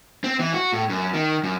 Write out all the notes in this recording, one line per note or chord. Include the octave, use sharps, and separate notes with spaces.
C4
E3
F#4
A2
F#2
D#3
F#2